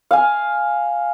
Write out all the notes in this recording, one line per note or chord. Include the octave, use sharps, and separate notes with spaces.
F5 G#5